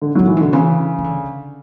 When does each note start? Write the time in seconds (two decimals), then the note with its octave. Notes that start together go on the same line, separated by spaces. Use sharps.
0.02 D3
0.15 A2 F#3
0.28 E3
0.37 B2 D3
0.53 C#3 E3
0.98 E3
1.04 D3